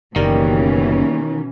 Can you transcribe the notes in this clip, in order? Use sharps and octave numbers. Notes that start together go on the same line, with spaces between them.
F#1 B2 D#3 E3 G3 A#3 C#4